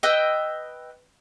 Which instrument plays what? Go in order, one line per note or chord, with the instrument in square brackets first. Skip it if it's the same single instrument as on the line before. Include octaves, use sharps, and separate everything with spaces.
[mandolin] B4 D#5 G5 E6